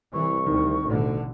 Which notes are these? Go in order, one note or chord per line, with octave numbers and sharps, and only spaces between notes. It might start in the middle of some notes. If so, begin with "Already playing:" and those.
C2 E3 C#6
D2 C3 D#3
A1 D2 B2 D3